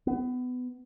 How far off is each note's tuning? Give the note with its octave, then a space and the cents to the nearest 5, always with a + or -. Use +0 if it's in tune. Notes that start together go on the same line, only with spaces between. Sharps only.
B3 +20